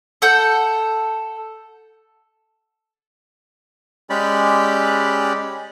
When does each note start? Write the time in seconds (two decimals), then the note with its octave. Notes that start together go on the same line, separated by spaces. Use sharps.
0.22 A4 F#5 G6
4.10 G#3 C#4 G4 D5 B5